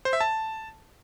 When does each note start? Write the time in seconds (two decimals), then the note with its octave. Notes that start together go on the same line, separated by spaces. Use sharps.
0.05 C5
0.13 E5
0.21 A5